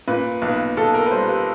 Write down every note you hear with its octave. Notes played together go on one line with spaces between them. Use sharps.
A#2 B4
B1 B4
B1 A4
A#4
B4
G3 C5
B4